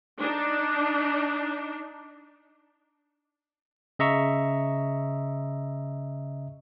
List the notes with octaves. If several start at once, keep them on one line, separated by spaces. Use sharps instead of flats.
D4 D#4
C#3 D#5 E5 A#5 C#6 E6